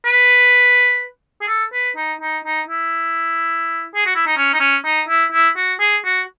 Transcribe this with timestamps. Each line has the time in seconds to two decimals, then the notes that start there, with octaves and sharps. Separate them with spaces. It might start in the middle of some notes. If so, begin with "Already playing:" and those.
0.05 B4
1.41 G#4
1.48 A4
1.73 B4
1.96 D#4
2.21 D#4
2.45 D#4
2.68 E4
3.95 G#4
4.06 F#4
4.16 E4
4.27 D#4
4.37 C#4
4.54 D#4
4.60 C#4
4.85 D#4
5.09 E4
5.32 E4
5.57 F#4
5.80 G#4
6.05 F#4